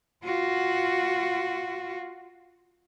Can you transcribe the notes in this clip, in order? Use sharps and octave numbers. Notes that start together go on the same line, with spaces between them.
F4 F#4